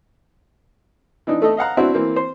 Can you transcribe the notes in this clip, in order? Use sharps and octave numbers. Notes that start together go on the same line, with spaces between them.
E3 D4 D#4
A3 A4 D#5
D#5 F5 F#5 A#5
C4 D4 E4 F#4
E3 A#3 C4
C5